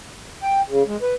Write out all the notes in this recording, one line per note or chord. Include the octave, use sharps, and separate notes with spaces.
G5
C#3
G#3
B4